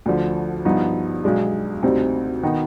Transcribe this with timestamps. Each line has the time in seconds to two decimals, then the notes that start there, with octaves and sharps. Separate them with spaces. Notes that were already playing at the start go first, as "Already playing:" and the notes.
0.06 D2 D3 F3
0.65 G2 F3 B3 D#4
1.24 B1 B2 G#3 D4
1.83 D2 C3 G3 C4 D#4
2.43 D#3 B3 D#4